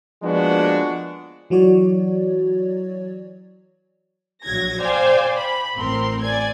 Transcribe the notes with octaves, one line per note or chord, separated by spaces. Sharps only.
F3 G#3 A#3 B3 D4 F#4
E3 F#3 F#4 C#5 D5
A#1 F#3 G#6 A#6
C5 D5 F5 G5 G#5
B5
A1 C4 A#4 C6
D5 G#5 G#6